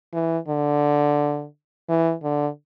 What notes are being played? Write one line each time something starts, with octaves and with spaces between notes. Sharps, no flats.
E3
D3
E3
D3